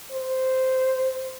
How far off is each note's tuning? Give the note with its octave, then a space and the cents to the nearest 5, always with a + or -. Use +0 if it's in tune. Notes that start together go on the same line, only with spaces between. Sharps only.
C5 -5